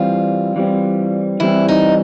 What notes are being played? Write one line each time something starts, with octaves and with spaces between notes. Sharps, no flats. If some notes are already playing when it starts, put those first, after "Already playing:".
Already playing: E3 G3 C4 F4
E3 G3 C4
E3 G3 C4 E4
D#4